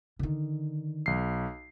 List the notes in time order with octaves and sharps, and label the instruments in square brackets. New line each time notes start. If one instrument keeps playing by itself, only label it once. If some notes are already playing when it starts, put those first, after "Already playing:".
[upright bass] D3 D#3
[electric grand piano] B1 C7